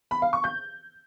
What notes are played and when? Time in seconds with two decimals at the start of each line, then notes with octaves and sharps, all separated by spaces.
0.11 B5
0.22 F5
0.33 C#6
0.44 G6